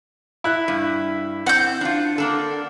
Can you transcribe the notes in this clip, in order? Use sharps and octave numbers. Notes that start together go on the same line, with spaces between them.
E4 F#6
G2
C4 F#5 G6
D4 F4
A#3 D4 A4